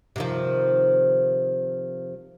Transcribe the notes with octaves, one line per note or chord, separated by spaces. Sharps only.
C3 D#3 F3